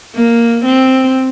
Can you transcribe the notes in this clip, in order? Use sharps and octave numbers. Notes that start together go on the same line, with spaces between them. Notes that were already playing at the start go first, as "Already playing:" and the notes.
A#3
C4